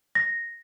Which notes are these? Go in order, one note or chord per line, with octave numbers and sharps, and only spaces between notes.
A#6